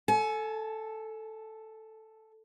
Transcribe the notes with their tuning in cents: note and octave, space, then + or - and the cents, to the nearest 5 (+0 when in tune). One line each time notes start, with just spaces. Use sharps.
A4 +0 G#5 +30